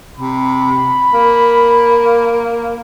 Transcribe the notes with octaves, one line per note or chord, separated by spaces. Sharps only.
C3 B5
A#3